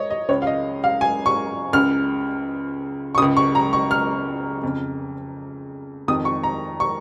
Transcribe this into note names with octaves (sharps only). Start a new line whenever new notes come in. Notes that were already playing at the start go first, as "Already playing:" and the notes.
Already playing: C#5 D#5
D#5
C#2 C#3 C#5
F5
D#5
F5
G#5
C#6
C#2 C#3 F6
C#6
C#2 C#3 D#6
C#6
A#5
C#6
F6
F2 C#3
F2 D#3 D#6
C#6
A#5
C#6